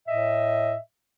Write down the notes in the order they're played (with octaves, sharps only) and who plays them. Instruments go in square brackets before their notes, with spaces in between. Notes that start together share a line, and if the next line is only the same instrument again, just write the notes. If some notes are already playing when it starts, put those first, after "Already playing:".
[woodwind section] A2 D#5 E5